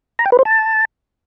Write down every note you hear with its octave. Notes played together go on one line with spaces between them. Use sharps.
A#5
G5
B4
C5
A5